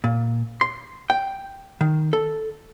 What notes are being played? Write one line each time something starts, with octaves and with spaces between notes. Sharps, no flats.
A#2
C6
G5
D#3
A4